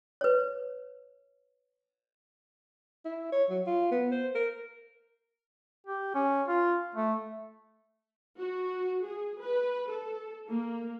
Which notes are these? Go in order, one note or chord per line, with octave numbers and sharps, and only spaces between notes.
B4 C#5
E4
C#5
F#3
F4
B3
C5
A#4
G4
C#4
F4
A3
F#4
G#4
B4
A4
A#3